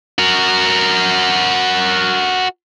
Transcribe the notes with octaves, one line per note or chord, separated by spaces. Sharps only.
F#4 A#4